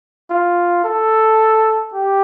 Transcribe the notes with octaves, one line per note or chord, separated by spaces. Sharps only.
F4
A4
G4